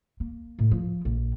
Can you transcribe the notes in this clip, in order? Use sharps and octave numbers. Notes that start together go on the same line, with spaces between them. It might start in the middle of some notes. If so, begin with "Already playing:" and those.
A#3
A2
F3
A#1